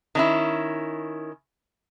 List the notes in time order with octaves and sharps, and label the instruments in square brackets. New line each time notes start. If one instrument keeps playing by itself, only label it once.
[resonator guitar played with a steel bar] D#3 C#4 E4